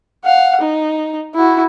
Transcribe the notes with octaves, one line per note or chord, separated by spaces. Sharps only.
F5 F#5
D#4
E4 F#4